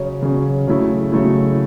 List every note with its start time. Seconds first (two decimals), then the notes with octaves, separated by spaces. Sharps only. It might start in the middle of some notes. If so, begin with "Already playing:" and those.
Already playing: C#3 F#3 C#4
0.22 C#3 F#3 C#4
0.68 C#3 F#3 A3 E4
1.12 C#3 F#3 A3 E4